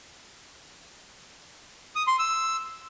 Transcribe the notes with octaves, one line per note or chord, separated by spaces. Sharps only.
D#6
C6
E6